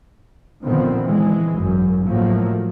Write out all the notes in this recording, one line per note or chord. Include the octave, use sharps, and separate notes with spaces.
A#2 D3 D#3 F3 B3 C4
E3 G#3
G#1 F#2
A2 F3 F#3 A3 A#3